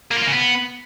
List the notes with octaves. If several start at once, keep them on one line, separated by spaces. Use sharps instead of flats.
A#3
F4
A#3
C#3
B3